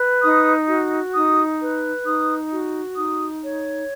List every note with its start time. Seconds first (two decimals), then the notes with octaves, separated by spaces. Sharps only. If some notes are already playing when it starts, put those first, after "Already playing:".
Already playing: B4
0.22 D#4 D#6
0.68 F#4
1.13 D#4 D#6
1.60 B4
2.05 D#4 D#6
2.51 F#4
2.96 D#4 D#6
3.43 C#5